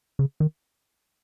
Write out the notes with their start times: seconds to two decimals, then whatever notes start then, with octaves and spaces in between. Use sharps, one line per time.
0.19 C#3
0.40 D#3